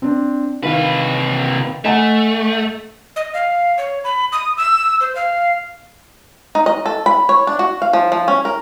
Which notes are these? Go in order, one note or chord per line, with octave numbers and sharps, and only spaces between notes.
C4 D4
C3 D#3 B4 F5
A3 D#5 F#5 G#5
D#5
F5
C#5
B5
D#6
E6
C5
F5
D#4
D#5
A4
B5
C#5
D4
F#4
F5
F3
F3
C#4
A#4